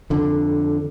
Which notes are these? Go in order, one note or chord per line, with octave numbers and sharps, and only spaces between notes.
F2 D3